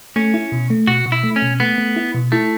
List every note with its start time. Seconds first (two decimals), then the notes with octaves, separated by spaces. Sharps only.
0.16 A3 C#4
0.34 E4
0.52 B2
0.70 A3
0.87 B2 F#4
1.06 B2
1.12 E4
1.23 A3
1.36 C#4
1.42 B2
1.60 A3 B3
1.78 A3
1.96 E4
2.15 B2
2.32 A3 E4